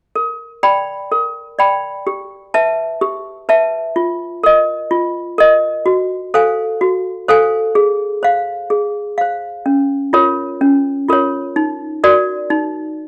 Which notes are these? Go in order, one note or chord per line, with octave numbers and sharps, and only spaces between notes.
A#4
D5 G5 B5
A#4
D5 G5 B5
G4
B4 E5 A5
G4
B4 E5 A5
F4
A#4 D#5
F4
A#4 D#5
F#4
A4 C5 F5 G#5
F#4
A4 C5 F5 G#5
G#4
C5 F5
G#4
C5 F5
C#4
F4 A#4 C#5
C#4
F4 A#4 C#5
D#4
F#4 A#4 D5
D#4